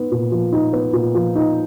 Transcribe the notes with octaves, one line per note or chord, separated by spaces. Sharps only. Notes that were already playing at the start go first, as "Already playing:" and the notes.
Already playing: B3 D#4
A#2
F3
D#4
B3
A#2
F3
D#4